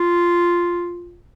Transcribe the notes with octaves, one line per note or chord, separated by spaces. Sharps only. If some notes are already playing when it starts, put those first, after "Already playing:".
Already playing: F4